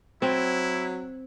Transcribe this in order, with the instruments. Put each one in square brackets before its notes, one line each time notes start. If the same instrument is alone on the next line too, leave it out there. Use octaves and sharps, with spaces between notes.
[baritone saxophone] F#3 [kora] C4 [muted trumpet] E4